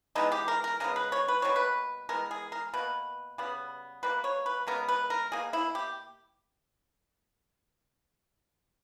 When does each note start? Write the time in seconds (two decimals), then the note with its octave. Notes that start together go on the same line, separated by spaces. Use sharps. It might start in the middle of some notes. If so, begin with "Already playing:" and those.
0.15 E3 G#3 B3 D#4
0.32 G4
0.48 A#4
0.64 A#4
0.80 C#3 G#3 B3 A#4
0.96 B4
1.12 C#5
1.28 B4
1.42 B2 G3 A#3 C#5
1.56 B4
2.09 E3 G#3 B3 A#4
2.31 G#4
2.52 A#4
2.73 B2 A#3 B4
3.38 C#3 G3 B3
4.03 B2 G3 A#3 B4
4.24 C#5
4.46 B4
4.67 C#3 G#3 B3 A#4
4.88 B4
5.10 A#4
5.32 B2 A#3 G#4
5.53 E4
5.75 G4